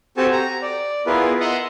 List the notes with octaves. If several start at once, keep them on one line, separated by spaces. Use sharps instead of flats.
C4 F#4 G4 A4 G#5 A5
A#5
D5
B3 E4 F4 G#4 A#4 B4
D#5 E5 F#5 A#5 C6 D#6